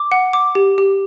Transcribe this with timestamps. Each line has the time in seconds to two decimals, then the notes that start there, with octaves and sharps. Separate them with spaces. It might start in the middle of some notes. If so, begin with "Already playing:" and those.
Already playing: D6
0.12 F#5
0.33 D6
0.55 G4
0.78 G4